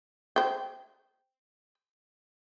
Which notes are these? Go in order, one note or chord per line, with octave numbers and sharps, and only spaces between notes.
C5 G5